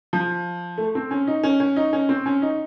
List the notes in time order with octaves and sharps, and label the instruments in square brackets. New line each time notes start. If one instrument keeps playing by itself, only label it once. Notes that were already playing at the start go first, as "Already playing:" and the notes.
[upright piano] F3
A3
C4
C#4
D#4
C#4
C#4
D#4
C#4
C4
C#4
D#4